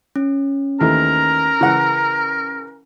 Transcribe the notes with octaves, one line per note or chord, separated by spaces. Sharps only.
C#4
D#2 E3 A3 A#4 A#5
C#3 E3 F#5